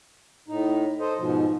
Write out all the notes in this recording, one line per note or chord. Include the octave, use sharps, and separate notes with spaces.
A2 D#4
A4 C5 D#5
G#2 B2 F3